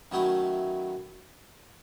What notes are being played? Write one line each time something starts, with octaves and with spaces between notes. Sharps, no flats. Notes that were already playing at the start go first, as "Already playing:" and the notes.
F#2 D#3 F#3 A3 E4